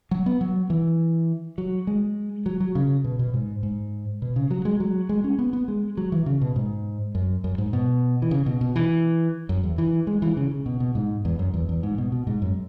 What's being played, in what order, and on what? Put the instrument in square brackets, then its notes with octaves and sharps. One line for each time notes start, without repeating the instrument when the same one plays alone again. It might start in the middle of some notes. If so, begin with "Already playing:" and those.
[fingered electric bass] F#3
B3
F#3
E3
F#3
G#3
F#3
F#3
C#3
B2
B2
G#2
G#2
B2
C#3
F#3
G#3
F#3
G#3
C#4
B3
B3
G#3
F#3
E3
C#3
B2
G#2
F#2
F#2
G#2
B2
E3
C#3
B2
B2
E3
F#2
E2
E3
G#3
E3
C#3
C#3
B2
B2
G#2
E2
F#2
E2
E2
G#2
B2
B2
G#2
F#2